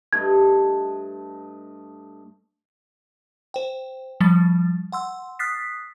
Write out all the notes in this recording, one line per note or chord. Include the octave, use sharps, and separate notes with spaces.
G2 A3 D#5 G#6
C5 G5
F3 G3 A6
F#5 C6 E6
D#6 F6 F#6 A6 B6 C7